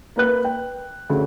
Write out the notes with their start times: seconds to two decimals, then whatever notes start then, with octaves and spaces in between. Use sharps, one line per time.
0.16 A#3 B4 F#6
0.44 G5
1.10 D2 C#3